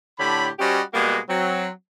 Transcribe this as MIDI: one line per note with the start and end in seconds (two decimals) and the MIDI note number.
0.19 0.49 45
0.19 0.49 50
0.19 0.49 67
0.19 0.49 73
0.19 0.49 83
0.59 0.81 55
0.59 0.81 61
0.59 0.81 66
0.59 0.81 67
0.59 0.81 72
0.59 0.81 75
0.93 1.18 47
0.93 1.18 55
0.93 1.18 56
0.93 1.18 58
0.93 1.18 66
1.28 1.68 54
1.28 1.68 60